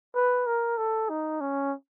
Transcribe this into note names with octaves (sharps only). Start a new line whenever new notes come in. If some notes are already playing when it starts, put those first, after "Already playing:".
B4
A#4
A4
D#4
C#4